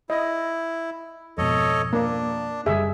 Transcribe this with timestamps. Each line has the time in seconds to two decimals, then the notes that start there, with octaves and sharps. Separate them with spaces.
0.10 E4 D#5
1.38 F2 G#2 B2 A4 C#5 D#5
1.93 A#3 D4
2.66 F#1 C3 G3 G#4 E5